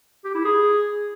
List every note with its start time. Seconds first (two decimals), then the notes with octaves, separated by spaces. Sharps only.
0.25 G4
0.35 E4
0.45 G#4